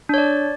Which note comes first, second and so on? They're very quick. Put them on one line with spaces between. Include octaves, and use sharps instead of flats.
D4 C#5 D5